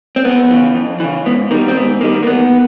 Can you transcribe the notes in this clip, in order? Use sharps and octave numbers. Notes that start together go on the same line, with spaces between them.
C4
F2 B3
C#3 E3
F2
C#3 E3
G#2 B3
D#3 G3 A#3
C4
G#2 B3
D#3 G3 A#3
A#3
E2 B3